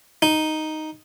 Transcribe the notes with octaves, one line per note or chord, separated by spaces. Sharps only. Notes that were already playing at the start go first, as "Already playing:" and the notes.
D#4